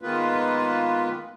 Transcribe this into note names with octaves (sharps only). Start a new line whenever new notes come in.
D#3 G#3 A#3 B3 F4 B4